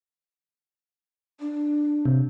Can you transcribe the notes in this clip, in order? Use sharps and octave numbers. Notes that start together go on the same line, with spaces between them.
D4
C3